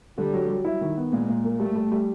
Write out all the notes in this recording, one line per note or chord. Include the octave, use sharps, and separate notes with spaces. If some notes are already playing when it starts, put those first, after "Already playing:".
D3 G3
F#3
F#3
E4
D#3
B3
A#2 G#3
A#2
A#3
G3 A3
G3
G3